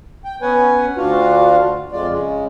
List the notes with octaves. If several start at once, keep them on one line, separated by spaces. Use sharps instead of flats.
G5
B3 C#4 B4 F#5 G#5
D2 D4 F4 F#4 F5
F2 G#3 F4 D5
C#3 G#3